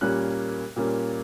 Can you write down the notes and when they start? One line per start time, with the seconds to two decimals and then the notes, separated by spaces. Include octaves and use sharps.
0.01 A#2 G3 A#3 C#4 F#6
0.76 A#2 G3 A#3 C#4